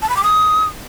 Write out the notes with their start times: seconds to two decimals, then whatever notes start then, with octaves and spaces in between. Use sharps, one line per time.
0.02 A5
0.09 B5
0.17 D6
0.24 D#6